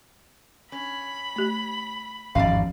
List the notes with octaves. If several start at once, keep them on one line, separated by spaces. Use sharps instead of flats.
C#4 B5
A3 G4
G#1 E2 G2 F3 C#4 D5 F5